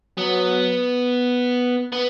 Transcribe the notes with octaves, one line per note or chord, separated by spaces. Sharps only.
F#3 B3
B3